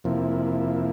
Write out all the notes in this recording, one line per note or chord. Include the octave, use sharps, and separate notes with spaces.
F2 C3 F3 A#3 E4